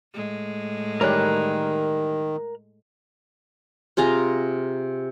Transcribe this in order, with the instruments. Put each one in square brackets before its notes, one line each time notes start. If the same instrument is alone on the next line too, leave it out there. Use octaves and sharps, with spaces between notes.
[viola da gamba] A2 G#3
[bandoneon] D#3 [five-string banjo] E3 G3 C#5 [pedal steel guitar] A#4 F#6
[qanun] C3 F4 G#4 A#5